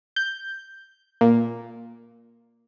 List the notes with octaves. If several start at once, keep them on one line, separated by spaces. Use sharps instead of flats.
G6
A#2